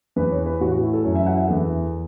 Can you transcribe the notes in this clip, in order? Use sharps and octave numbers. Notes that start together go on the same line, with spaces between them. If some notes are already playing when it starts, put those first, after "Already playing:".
E2 E3 B4
C#5
B4
A2 E3 F#4
F#4
E4
A4
F#2 E3 C#5
E5
F#5
E5
E2 E3 A4